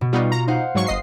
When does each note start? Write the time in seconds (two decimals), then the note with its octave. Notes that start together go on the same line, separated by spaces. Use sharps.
0.01 B2
0.13 G3 B3 D#4 F4 F#4
0.32 A#5
0.48 D#4 C5 F5 F#5
0.75 G#2 F#3 C#6
0.87 G1 D#5 C7